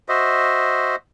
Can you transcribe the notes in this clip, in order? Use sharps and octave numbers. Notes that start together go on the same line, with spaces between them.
F#4 C5 D#5 E5